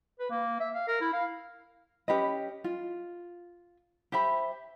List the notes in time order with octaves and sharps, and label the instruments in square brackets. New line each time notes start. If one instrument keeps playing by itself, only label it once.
[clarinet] B4
A#3
E5
F5
A#4
E4
F5
[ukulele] C#4 G4 B4 D#5
F4
G4 C5 E5 B5